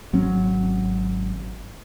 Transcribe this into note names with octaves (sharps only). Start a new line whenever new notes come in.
G#1 F#3 C4 C#4